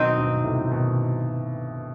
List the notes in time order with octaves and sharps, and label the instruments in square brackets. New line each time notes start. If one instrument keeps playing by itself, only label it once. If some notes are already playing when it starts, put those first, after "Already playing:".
Already playing: [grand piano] B2 D#3 [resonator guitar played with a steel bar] F#3 C4 D#4
[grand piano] G2 B2
A2 C3
B2 D#3